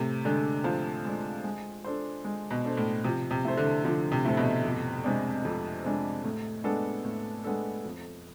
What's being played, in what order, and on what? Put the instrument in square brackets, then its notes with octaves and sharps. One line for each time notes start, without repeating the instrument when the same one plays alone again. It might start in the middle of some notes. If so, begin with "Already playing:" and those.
Already playing: [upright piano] A2 [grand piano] C3
[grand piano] D3 [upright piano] G#3 D4
[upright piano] A2 [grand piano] F3
[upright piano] G#3 D4
G#3
D4 A4 C5
G#3
[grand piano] B2
[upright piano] D4 A4 C5
[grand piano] A2
[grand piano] C3 [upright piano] F3
[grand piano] C3
[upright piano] A3 E4 A4 C5
[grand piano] D3
[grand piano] D3 [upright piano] F3
[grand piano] C3
[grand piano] A2 [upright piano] A3 E4 A4 C5
[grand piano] B2
[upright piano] F2
C3 G#3 D4
F2
C3 G#3 D4
A2
G#3 B3 D4 A4
A2
G#3 B3 D4 A4
F2